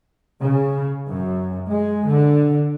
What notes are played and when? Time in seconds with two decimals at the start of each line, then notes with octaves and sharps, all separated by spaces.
0.42 C#3
1.11 F#2
1.71 G#3
2.08 D3